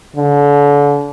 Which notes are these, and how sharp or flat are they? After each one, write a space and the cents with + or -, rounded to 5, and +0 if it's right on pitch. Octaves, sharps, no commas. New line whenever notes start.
D3 -35